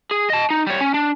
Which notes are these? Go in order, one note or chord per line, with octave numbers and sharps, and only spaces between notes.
G#4
D#5 A5
D#4
G3 C#5
C#4
D4